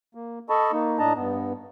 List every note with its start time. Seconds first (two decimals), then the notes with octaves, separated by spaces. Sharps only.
0.15 A#3
0.50 A4 D#5 A5 B5 C#6
0.72 A#3 D#4
0.99 A2 D4 D#5 A5 A#5
1.16 G2 B3